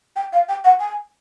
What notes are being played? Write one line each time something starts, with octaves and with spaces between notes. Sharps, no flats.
G5
F5
G5
F#5
G#5